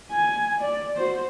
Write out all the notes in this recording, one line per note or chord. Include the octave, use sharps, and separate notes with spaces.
G#5
D5
F#4 C5